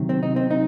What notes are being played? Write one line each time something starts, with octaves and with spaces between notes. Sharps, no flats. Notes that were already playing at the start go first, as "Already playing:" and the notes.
Already playing: C3 D#3 F#3
C4
D#4
C4
D#4